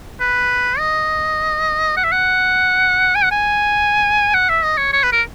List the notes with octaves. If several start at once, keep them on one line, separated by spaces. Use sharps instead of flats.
B4
D#5
F#5
E5
F#5
G#5
F#5
G#5
F#5
E5
D#5
C#5
C#5
B4
A#4